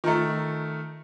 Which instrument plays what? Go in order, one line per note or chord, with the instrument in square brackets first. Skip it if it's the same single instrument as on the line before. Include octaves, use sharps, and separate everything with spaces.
[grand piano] D#3 A3 [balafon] F4 A#5